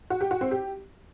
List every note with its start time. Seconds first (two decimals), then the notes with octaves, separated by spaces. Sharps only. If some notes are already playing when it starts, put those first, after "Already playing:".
0.10 F#4
0.21 G4
0.31 F#4
0.41 C4
0.51 G4